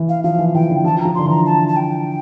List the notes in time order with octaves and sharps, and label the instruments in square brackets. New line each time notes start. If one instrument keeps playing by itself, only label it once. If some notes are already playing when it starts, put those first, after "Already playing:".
Already playing: [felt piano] E3
[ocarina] F5
[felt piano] F3 [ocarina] F5
[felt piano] E3
[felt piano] E3 [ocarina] G5
[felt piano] D3
[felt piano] F3 [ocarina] A5
[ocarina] A#5
[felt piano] F3
[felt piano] D3 [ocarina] C6
[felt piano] E3 [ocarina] A#5
[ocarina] A5
A5
G5